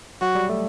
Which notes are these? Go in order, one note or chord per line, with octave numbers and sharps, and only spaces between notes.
F#3 F#4
G3
A3